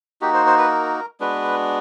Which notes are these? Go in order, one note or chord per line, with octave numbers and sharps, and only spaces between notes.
A#3 D#4 F#4 G4
C5
C5
B4
A#4
G#3 B3 D4 F#4 B4